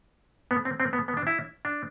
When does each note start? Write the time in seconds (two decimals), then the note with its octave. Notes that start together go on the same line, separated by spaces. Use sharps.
0.51 B3
0.65 C4
0.80 C4
0.93 B3
1.08 B3
1.17 D4
1.27 E4
1.65 D4